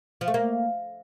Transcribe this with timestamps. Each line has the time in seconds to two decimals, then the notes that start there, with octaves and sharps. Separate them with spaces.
0.21 F3
0.28 A3
0.34 A#3